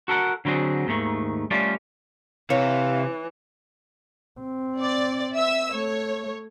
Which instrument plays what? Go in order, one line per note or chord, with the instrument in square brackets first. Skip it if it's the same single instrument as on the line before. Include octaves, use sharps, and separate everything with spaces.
[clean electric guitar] F#4 A4 A#4 F#5
D3 F#3 C4 F#4 G#4
D#2 G#2 D#3 A3
G3 A3 C#4 F4 D5
[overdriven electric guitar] C3 [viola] E3 [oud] C#5 [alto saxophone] F5
[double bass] C4
[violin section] D5
E5 E6
[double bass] A3 [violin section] C#5